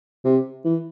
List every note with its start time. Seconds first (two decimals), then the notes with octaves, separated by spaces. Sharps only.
0.25 C3
0.65 E3